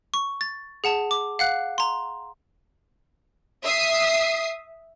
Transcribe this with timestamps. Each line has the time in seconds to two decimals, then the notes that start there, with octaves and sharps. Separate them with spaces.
0.14 C#6
0.41 A6
0.84 G#4 F#5 A5
1.11 D6
1.39 F5 F#5 F#6
1.78 A#5 C6
3.64 E5 D#6 C7